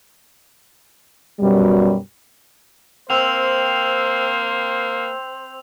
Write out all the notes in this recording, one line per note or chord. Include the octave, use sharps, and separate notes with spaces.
F#2 B2 G3
A#3 C4 C5 E6 F7